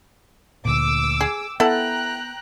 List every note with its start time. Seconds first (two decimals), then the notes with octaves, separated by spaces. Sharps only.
0.65 D2 A#2 D6 E6
1.21 G#4
1.60 B3 E4 A4 F#5 G5 A#5 F#6